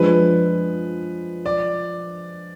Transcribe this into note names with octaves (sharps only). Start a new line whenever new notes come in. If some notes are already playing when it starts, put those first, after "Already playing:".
Already playing: F3 G#3 D4 B4
D5